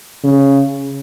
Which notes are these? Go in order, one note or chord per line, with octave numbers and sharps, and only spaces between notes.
C#3